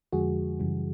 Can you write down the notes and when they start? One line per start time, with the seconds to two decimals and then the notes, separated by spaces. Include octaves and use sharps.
0.12 F2 D3 F3 G#3 F#4 G#4
0.60 F#2 C#3 E3 G3